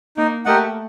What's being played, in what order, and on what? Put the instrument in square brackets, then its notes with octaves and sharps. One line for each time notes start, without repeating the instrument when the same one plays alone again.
[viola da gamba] A#3 [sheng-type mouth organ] D#4
[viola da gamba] A3 [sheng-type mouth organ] G4 A#4 D#5 F#5